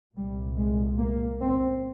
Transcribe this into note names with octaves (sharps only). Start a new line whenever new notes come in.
C2 A#2 G3
G#3
A#3
C4